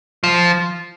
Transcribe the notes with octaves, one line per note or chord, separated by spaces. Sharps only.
F3